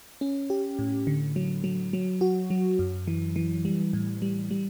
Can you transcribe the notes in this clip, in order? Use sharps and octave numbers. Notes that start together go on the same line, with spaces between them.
C#4
G4
A2
D3
F#3
F#3
F#3
F#4
F#3
F#2
E3
E3
G3
A2
G3
G3